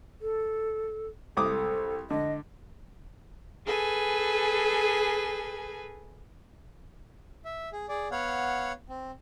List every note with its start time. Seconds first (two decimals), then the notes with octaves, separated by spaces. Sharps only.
0.22 A4
1.37 C2 A4 D6 D#6
2.10 D3 D#5
3.65 G#4 A4 B4 G#5
7.45 E5
7.73 G#4
7.89 G#4 D5
8.12 B3 C#5 F5 F#5
8.90 C4